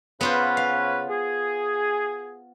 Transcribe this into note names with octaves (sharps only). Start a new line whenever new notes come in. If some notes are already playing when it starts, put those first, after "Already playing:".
C#3 B3 C#4 F4 B4 C5
F5
G#4